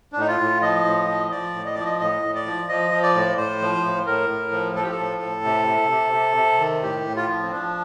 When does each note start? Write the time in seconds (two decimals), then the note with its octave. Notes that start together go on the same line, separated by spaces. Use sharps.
0.13 D4
0.16 A2 D#4
0.27 F4
0.40 A2
0.62 F3 D#5
0.85 A2
1.08 F3
1.31 F3 D5
1.53 A2
1.66 D#5
1.74 F3 D5
1.85 D#5
1.99 A2 D#5
2.22 A2
2.35 D5
2.46 F3
2.69 F3 D#5
2.91 F3
3.03 D5
3.15 A2
3.37 A2 C5
3.61 F3
3.83 A2
4.06 A2 A#4
4.29 A2
4.52 F3
4.75 F3 A4
4.83 G4
4.91 A4
4.98 A2
5.22 A2
5.44 C3
5.67 C3
5.90 C3
6.13 C3
6.36 C3
6.59 D#3
6.82 A2 G4
7.06 A2
7.16 F4
7.29 F3
7.43 C4
7.51 F3 D4